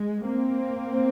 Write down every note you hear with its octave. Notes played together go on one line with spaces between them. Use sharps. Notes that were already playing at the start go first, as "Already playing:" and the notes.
Already playing: G#3
A#3 C4